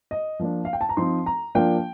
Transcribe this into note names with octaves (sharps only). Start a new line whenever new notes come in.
D#5
F3 A#3 D4
F5
G5
A5
A#5
F3 C4 D#4 C6
A#5
F3 A#3 D4 F4 G5